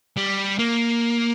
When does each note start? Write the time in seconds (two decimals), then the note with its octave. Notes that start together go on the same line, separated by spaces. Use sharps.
0.17 G3
0.59 A#3